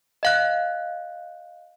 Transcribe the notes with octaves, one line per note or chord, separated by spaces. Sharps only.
D#5 F5 F#6